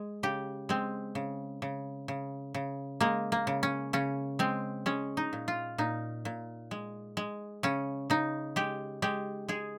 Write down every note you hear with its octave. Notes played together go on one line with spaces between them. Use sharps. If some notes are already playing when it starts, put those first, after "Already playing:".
Already playing: G#3
C#3 G4
G#3 C4
C#3
C#3
C#3
C#3
G#3 A#3
A#3
C#3
C#4
C#3 C#4
G#3 C4
G#3 C#4
D#4
A#2
F4
A#2 D#4
A#2
G#3
G#3
C#3 C#4
C#3 D#4
G#3 G4
G#3 G4
G#3 G#4